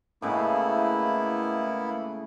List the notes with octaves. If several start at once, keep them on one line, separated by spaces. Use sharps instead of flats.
A2 C#3 G#3 A#3 B3 E4